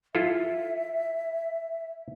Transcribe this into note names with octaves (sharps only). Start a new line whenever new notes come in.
E4 F4 A4 E5